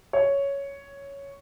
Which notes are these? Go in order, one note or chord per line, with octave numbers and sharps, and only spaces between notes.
C#5